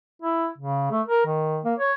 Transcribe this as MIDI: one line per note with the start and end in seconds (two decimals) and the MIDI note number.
0.22 0.47 64
0.58 0.91 49
0.92 1.01 57
1.07 1.25 70
1.26 1.59 51
1.65 1.74 58
1.80 1.93 73